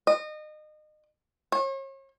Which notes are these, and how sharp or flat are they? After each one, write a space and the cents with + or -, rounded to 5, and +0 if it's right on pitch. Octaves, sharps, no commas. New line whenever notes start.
D#5 -30
C#5 -40